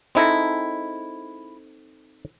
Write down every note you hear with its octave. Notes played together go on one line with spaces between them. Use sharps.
G#3 C4 D#4 E4 A4